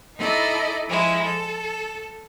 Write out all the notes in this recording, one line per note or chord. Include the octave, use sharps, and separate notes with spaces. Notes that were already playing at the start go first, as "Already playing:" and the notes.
D#4 E4 A4 D5 D#5
F3 G#3 E4
A4